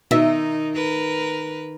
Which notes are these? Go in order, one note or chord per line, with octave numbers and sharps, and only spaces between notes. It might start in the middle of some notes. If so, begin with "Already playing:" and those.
B2 D#3 D#4 E5
A#4 B4